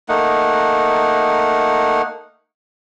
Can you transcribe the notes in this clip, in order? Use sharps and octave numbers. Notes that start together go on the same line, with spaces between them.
A3 A#3 D#4 F#5